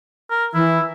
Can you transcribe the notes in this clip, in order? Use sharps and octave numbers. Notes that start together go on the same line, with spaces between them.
A#4
E3 E4